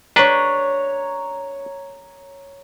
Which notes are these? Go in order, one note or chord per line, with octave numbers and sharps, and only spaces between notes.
D4 B4 C#5 A#5